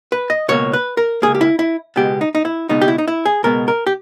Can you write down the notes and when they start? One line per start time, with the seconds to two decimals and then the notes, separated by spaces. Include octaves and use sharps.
0.12 B4
0.30 D#5
0.48 C#2 B2 A#3 C#5
0.73 B4
0.97 A#4
1.22 C#2 B2 A#3 G#4
1.35 G4
1.41 E4
1.59 E4
1.96 C#2 B2 G#3 B3 G4
2.21 D#4
2.35 D#4
2.45 E4
2.69 C#2 B2 G#3 B3 D#4
2.82 G4
2.88 E4
2.98 D#4
3.08 E4
3.25 G#4
3.43 C#2 B2 G#3 B3 A#4
3.68 A#4
3.87 G4